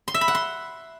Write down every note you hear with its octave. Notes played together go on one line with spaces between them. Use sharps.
C6
E5
B5
F#5
C6